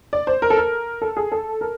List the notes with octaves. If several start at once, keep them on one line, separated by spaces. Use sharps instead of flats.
D5
C5
A#4
A4
A#4
A4
G#4
A4
A#4